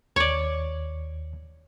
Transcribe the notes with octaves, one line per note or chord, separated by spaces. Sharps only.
D#2 C#5 D5